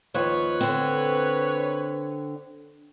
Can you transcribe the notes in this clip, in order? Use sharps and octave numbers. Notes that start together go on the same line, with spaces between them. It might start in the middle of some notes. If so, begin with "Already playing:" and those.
D#2 F3 B4 C#5
D3 C4